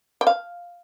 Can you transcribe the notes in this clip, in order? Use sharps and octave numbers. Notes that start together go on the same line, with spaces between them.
G5
F5